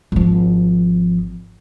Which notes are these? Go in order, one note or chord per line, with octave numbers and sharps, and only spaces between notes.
G#1 F3